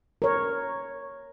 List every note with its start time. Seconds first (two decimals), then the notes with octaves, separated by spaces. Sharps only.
0.22 A#4 C#5